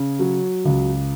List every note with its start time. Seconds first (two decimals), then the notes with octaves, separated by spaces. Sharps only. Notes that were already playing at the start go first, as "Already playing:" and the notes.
Already playing: C#3
0.19 F#3
0.65 C#2